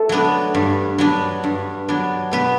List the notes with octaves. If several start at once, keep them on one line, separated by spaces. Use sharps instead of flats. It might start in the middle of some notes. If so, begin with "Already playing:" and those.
Already playing: A3 A4
F#3 B3 D4
G2
F#3 B3 D4
G2
F#3 B3 D4
B2 B3 B4